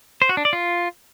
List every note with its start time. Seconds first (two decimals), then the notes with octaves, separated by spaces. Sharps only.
0.22 C5
0.29 F#4
0.37 D4
0.45 D5
0.53 F4